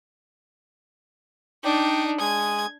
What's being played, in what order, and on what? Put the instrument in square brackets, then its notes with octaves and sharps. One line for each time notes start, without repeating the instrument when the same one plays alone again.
[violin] D4 D#4 [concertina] D5 G5
[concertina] G#3 G#5 D#6 [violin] G#6